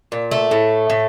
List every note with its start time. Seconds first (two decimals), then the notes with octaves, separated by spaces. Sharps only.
0.12 A#2
0.31 A3
0.51 A2
0.90 A2